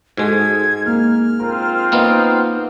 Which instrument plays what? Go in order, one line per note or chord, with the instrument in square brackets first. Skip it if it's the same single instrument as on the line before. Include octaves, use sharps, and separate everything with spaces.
[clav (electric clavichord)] G#2 G#3 [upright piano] F#4 G#4 A4 [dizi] G#6
[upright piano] A#3 [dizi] F6
[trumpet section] C4 F4 [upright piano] A#4
[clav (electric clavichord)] A#3 B3 D#4 [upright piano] F#5